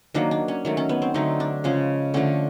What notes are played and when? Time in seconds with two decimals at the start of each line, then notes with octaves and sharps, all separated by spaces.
0.14 D#3 F#3 A#3 D4
0.31 D4
0.48 C#4
0.65 D#3 F#3 A3
0.77 C#4
0.89 B3
1.02 C4
1.14 D3 F#3 A3 D#4
1.40 D4
1.64 C#3 F3 G#3 C#4
2.14 D3 F3 A3 C#4